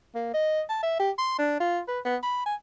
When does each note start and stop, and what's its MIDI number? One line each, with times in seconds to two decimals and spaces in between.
0.15 0.33 58
0.34 0.62 75
0.69 0.80 81
0.83 0.99 76
0.99 1.11 67
1.18 1.36 84
1.39 1.55 62
1.60 1.80 65
1.88 2.00 71
2.05 2.17 59
2.23 2.41 83
2.46 2.55 80